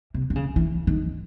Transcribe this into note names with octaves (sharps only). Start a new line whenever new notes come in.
C3
D3
C#3
E3
D#3